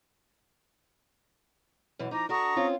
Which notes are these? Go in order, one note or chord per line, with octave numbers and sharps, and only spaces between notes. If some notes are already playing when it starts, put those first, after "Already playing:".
F#2 B2 E3
F3 D#4 A#5 D6
D4 F#4 A4 A#5 C#6 D#6
C4 C#4 F4